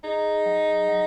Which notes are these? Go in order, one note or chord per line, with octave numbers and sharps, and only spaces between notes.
D#4 G#4
F#3
F#3